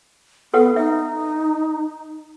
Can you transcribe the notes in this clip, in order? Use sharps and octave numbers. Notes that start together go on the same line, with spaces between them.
B3 A4 B4 F#5
D#4 E5